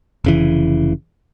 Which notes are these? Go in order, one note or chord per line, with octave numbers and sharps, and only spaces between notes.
F1 C#3 E3